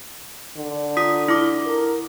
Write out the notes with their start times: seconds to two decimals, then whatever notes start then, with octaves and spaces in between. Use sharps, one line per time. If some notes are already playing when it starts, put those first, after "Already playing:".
0.57 D3
0.97 F4 D#6 B6
1.28 E4 D6
1.66 A#4